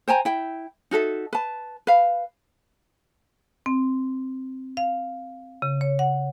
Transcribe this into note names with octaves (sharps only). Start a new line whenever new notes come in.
C5 G5 G#5 A#5
E4 G5
D#4 F#4 A4 E5
B4 A5
B4 F5
C4
F5
C#3
C#5
F#5